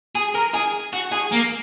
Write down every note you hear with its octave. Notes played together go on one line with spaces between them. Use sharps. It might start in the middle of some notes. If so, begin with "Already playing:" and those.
G#4
A#4
G#4
F#4
G#4
A#3